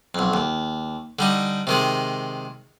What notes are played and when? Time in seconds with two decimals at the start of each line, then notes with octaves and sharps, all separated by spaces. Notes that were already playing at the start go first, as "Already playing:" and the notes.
0.15 B1 F2
0.34 D#2
1.19 D3 G3 D#4
1.67 C3 D#3 G#3